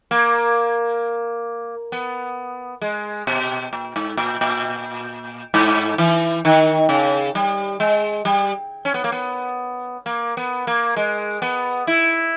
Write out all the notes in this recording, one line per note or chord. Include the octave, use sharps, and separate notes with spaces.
A#3
B3
G#3
B2
A#2
G#2
A#2
A#2
G#2
E3
D#3
C#3
G3
G#3
G3
C#4
B3
A#3
B3
A#3
B3
A#3
G#3
B3
E4